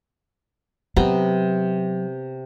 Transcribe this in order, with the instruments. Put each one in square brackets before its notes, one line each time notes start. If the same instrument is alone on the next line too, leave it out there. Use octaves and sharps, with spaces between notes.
[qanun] C3 B3 A#5 [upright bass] F#3